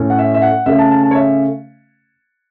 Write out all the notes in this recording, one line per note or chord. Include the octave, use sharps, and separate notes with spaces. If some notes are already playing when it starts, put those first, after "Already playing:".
Already playing: A2 A3 C#4
F#5
E5
E5
F#5
C#3 A3 C#4 E5
A5
A5
A5
C#5
E5